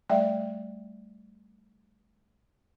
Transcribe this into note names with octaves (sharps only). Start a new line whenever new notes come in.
G3 A3 D5 E5 F5 G5